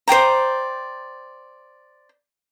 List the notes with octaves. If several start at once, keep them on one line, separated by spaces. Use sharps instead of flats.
C5 D5 G5 A#5